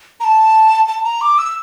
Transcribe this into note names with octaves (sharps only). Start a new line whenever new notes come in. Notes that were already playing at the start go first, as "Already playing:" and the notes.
A#5
A5
A5
A#5
D6
E6